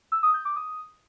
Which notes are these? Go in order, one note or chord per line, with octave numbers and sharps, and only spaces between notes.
E6
D#6
G6
D6
D#6